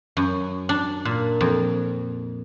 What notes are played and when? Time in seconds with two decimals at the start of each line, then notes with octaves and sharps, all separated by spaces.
0.17 F#2
0.69 D4
1.05 A#2
1.41 F2